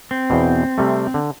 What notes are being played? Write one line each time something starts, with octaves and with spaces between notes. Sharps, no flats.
C4
E2 B2
C3 G3 A3
D3